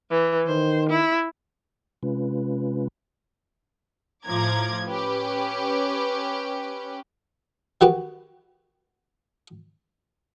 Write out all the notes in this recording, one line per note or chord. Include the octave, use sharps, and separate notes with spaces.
E3
D#3 C5
E4
C3 G#3 C#4 F4 B4
A2 F3 A#5 D6 G#6
C#4 G4 B4
D#3 F#4 G4 B4